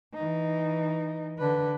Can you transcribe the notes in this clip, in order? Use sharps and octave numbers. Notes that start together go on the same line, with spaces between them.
E3 D#4
D3 B4